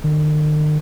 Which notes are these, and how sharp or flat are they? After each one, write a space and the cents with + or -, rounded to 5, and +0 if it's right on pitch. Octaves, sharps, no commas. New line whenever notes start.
D#3 -45